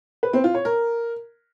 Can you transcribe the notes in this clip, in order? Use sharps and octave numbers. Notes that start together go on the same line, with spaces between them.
B4
C4
F4
C#5
A#4